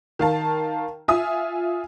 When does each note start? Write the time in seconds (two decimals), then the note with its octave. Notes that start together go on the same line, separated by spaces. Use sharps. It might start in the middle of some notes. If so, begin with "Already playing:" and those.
0.19 D#3 F5 A5
1.08 F4 E5 G#5 D#6